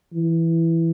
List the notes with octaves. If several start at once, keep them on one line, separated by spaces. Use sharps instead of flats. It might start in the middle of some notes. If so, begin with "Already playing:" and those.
E3